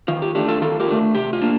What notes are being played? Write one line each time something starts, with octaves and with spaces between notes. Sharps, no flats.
D#3 F4
G4
A3 D4 G4
F4 A4
D#3 F4 A4
G4 A#4
A3 D4
C3 G4
F4
A#3 D4